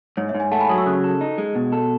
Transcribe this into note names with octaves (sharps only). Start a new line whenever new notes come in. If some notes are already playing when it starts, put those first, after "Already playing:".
G#2 C#5
C#5 E5
G#2
E5 G#5
A3 F#5 A5
G#5 B5
F#3 D#6
C#6 E6
C#3 D#6 F#6
A4
D#4
G#3
B2
A4